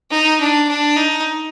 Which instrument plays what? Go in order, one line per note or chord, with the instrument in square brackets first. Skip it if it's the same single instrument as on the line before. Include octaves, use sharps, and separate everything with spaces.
[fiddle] D#4
D4
D4
D#4